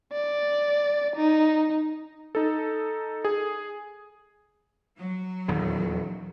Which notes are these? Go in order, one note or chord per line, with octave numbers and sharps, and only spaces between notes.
D5
D#4
D#4 A4
G#4
F#3
D#1 E2 D#3